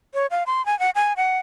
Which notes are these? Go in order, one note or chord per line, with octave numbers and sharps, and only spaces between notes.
C#5
F5
C6
G#5
F#5
G#5
F#5